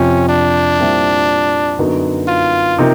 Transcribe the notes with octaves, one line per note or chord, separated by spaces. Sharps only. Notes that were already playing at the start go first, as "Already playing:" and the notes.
Already playing: F2 C3 F3 C#4
D4
A#2 G3 C4 E4
F#2 D3 F#3 B3 D#4
F4
C3 F3 A#3 D#4